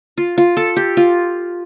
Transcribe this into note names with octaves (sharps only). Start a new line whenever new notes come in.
F4
F4
A4
G4
F4